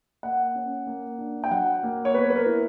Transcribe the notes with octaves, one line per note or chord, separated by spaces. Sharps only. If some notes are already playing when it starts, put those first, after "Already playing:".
A#3 F#5
C#4
A#3
D4
G5
F#3 F#5
A#3
C#5
B3 B4
B4
A#4
E4